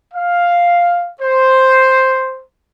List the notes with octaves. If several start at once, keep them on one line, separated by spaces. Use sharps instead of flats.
F5
C5